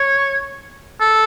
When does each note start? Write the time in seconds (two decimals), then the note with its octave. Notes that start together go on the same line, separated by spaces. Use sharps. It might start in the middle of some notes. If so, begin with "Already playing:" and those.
Already playing: C#5
1.00 A4